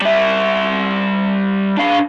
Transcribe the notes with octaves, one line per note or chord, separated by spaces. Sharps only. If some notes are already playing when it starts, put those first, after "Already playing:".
G3 E5
D4 F5